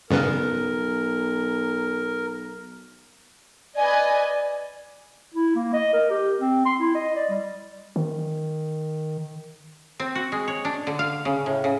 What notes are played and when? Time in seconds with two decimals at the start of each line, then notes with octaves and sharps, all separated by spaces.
0.11 B1 G2 C#3 B3 A#4
3.75 B4 D5 D#5 G#5
5.34 E4
5.55 A#3
5.73 D#5
5.94 A#4
6.11 G4
6.40 C4
6.66 C6
6.80 E4
6.95 D#5
7.16 D5
7.30 G3
7.96 D#3
10.00 C4
10.15 F#4
10.32 G#3
10.48 C#5
10.65 D4
10.87 D3
10.99 F5
11.25 C#3
11.46 A2
11.64 C#3